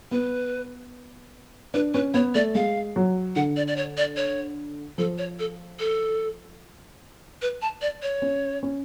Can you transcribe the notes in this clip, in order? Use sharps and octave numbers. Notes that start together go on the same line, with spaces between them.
B3 B4
D4 B4
C#4 B4
B3 C#5
A3 D5
G#3 F5
F#3
D3 F#5
D5
D5
C#5
D5
C#5
F3 A4
C#5
A4
A4
B4
A5
D5
C#5
C#4
C#4